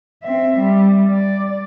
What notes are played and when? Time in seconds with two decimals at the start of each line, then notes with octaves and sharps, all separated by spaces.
0.23 C4 E5
0.59 G3
1.10 D5